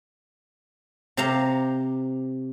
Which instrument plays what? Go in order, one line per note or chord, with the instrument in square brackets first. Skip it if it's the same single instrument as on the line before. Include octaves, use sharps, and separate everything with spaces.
[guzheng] C3 G4 C5 F5 A#5